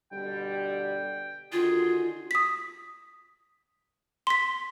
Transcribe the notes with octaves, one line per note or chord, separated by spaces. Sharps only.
B2 D3 G3 G5
D3 D#3 F4 F#4 G#4
D#6 B6
C6 B6